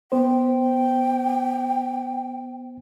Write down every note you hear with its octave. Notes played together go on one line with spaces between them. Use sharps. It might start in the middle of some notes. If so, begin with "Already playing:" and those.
B3 C5 G5